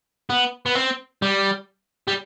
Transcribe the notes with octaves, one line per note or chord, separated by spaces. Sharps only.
B3
B3
C4
G3
G3